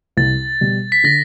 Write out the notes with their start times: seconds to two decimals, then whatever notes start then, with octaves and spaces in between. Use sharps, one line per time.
0.17 C2 A6
0.61 B2 G3
0.92 B6
1.04 D3 A#6